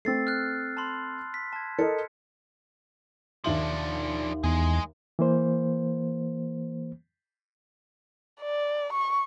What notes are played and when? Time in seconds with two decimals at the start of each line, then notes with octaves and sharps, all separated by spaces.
0.05 A3 C4 E6 A6 C7
0.27 F6 F#6
0.77 A5 B5 C6
1.34 B6
1.53 A5 G#6
1.79 A4 A#4 D#5 C#7
3.44 D#2 F3 D4 E5 F#7
4.44 E2 G#3 G#4
5.19 E3 A#3 C5
8.41 D5
8.93 C#6